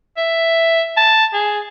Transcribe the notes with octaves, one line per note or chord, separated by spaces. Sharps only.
E5
A5
G#4